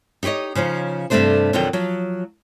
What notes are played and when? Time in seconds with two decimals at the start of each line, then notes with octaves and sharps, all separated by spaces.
0.23 D#4 G4 B4 C#5 D#5
0.55 C#3 F3 C#4 D#4
1.10 G2 C3 G#3 A3 D4 C5
1.53 F2 B2 D3 D#3 F#3 G5
1.73 F3 F#3